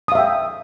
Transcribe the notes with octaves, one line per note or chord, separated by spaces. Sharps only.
E5 F5 G5 D#6